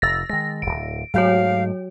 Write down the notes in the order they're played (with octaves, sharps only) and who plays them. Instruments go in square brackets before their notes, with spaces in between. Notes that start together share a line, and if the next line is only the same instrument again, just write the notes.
[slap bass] F1 [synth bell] E6 A6 A#6
[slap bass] D#3 G#3 [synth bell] A#6
[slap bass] D1 B1 [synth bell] D7
[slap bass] G#2 A3 [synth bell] F#3 F#4 C#5 [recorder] F5